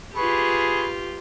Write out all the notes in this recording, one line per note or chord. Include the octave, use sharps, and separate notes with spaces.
F4 G4 G#4 B4 B5 C#6